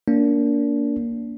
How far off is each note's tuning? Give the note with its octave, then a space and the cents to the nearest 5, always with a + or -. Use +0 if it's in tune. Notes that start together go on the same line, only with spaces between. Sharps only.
A#3 +0 D4 -30